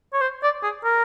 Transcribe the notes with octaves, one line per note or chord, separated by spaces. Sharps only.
C#5
C5
D5
G#4
A#4